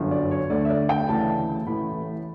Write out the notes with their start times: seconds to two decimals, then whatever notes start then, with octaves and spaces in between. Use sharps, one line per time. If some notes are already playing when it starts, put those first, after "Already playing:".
Already playing: G1 F#2 D3
0.11 D5
0.31 C#5
0.50 D2 D3 D5
0.65 E5
0.70 D5
0.89 G5
1.09 D2 C#3 E3 A5
1.66 A1 A2 E3 B5